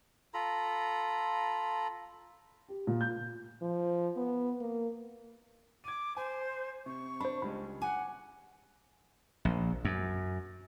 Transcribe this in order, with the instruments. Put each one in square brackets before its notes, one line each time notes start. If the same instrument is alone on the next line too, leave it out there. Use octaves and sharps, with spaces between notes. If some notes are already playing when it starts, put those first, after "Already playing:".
[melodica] F4 A4 A#5 B5
[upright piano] G4
A#2
G6
[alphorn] F3
B3
A#3
[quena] D6 [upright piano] G#6 D#7
[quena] C5 [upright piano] G#5
[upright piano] C3 [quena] C#6
[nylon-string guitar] D4 [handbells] C5 B5
[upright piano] C#2 G3 G#3 [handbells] B5
[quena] F#5 [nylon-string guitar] G#5 [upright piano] D6
[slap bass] A#1
F#2